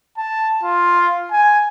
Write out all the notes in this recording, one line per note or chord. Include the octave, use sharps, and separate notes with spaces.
A5
F4
G#5